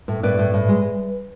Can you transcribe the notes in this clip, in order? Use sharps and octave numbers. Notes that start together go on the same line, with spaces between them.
A2
A2 B4 D5
A2
A2
G#3